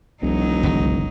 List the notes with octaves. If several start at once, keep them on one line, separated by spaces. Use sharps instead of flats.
E1 C2 F#3 D#4
G1 C#2 D#3